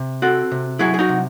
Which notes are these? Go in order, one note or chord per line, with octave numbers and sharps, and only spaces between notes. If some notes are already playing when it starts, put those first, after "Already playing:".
Already playing: C3
C4 F#4 A4
C3
F#3 E4 G#4
G#4
D#4 F#4
C3